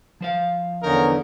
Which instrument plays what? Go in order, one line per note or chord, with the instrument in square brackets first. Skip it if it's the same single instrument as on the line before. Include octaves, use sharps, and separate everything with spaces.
[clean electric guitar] F3 C5 F5
[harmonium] E2 D3 [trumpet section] C#4 D#4 A#4